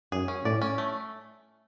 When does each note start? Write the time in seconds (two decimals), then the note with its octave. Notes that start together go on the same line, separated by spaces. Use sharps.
0.12 F#2 G#4
0.28 C#4
0.45 A2 D5
0.62 C#4
0.78 A3